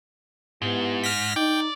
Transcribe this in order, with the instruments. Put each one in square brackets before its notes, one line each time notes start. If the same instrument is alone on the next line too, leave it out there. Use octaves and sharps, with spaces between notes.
[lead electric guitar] G#2 [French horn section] B3 E4 G4
[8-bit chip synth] F6 A#6 B6
[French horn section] D#4 [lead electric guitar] D5 [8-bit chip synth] G5